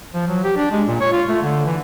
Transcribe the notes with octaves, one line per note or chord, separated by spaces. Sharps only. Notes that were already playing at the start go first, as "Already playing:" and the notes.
F3
F#3
G4
D4
G#3
A#2
C#5
F4
A3
D3
E3